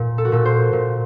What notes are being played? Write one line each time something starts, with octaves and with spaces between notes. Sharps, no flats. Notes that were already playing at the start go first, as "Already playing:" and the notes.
Already playing: A#2
A4
F#4
A#2 A4
C5
A#2